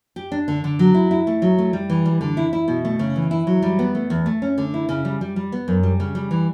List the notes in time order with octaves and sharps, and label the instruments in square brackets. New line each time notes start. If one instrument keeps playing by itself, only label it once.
[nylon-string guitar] G4
D4
D3
D3
F#3
E4
E4
A3
F#3
A3
G3
E3
G3
D3
E4
E4
B2
A3
C#3
E3
E4
F#3
G3
B3
A3
E2
A3
C#4
D3
E4
C#3
G3
G3
G3
B3
F#2
G3
C#3
G3
E3